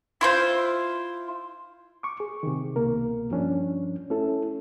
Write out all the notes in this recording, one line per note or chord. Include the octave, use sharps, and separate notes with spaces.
E4 F4 C5
C#6 D6
G#4
C3 D#3
C2 B2 A#3 A#4
G2 F3 C#4 D4
A3 C#4 E4 A4